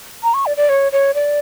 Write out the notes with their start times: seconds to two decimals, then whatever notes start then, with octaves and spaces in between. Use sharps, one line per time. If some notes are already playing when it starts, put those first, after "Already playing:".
0.23 A#5
0.34 C#6
0.46 D5
0.57 D5
0.69 C#5
0.92 C#5
1.15 D5